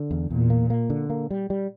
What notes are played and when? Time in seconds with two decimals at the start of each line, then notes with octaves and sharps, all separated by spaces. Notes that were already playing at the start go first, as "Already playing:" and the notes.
Already playing: D3
0.11 E2
0.30 E2 A#2
0.50 A#3
0.70 A#3
0.90 D3
1.10 A#3
1.30 G3
1.50 G3